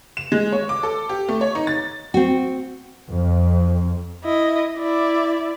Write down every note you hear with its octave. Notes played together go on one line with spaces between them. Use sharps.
E7
G#3
C#5
D6
A4
G4
A3
C#5
D#4
A6
C4 F#4
F2
E4 D#5
E4 D5